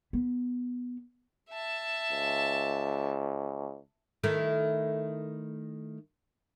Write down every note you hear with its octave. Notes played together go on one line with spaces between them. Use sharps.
B3
E5 A5
C#2
D#3 A3 E4